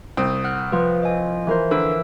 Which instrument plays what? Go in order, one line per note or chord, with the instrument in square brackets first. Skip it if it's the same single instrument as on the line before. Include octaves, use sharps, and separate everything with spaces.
[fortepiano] C2 C4 [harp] D#6
[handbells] F#5 F6 F#6
[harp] F3 [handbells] B4
[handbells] D#5 G#5
[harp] E3 A#4 C5
[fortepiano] D3 [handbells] A#4 E6 D7 [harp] B4